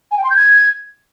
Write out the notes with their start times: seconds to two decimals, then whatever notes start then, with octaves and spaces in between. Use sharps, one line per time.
0.11 G#5
0.18 G5
0.24 C6
0.30 G6
0.36 G#6